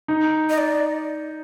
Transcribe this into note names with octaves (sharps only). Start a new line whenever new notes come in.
D#4
D#5
D5